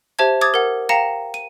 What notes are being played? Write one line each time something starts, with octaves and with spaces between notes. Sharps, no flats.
G4 C5 E5 A5 G#6
D6 D#6 G#6 A6
A#4 F#5
F5 G5 A#5 A#6 C#7 E7
D#7